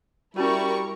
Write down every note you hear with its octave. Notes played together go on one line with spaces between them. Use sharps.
G3 C#4 E4 F#4 A#4 C#6